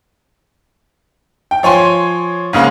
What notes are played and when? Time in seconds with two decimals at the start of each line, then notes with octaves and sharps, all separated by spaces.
1.51 G5
1.63 F3 C#5 G#5 C6
2.53 G#2 C#3 G#3 A#3 C#4